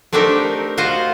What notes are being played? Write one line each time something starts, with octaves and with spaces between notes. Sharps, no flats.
A3 C4 D4 D#4 G4 A#4
F4 F#4 C5 D#5